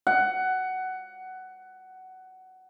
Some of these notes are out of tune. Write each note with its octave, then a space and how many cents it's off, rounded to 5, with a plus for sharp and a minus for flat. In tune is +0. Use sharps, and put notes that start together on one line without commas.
F#5 +15